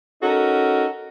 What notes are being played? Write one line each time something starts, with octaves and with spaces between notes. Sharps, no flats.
C#4 D#4 F#4 A4 A#4